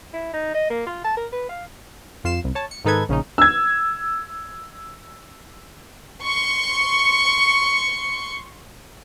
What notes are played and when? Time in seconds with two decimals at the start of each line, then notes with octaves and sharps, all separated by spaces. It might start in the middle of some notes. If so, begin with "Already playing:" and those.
0.13 E4
0.33 D#4
0.54 D#5
0.70 A#3
0.87 F4
1.05 A5
1.17 A#4
1.32 B4
1.49 F5
2.24 F2 F4 C7 E7
2.44 C2
2.55 C#5 A5
2.71 C#7
2.85 G#2 D#3 D#4 A4 B4 G#6
3.09 A#1 C#3 C#4 D#4
3.38 E6 G#6
6.24 C6 C#6 C#7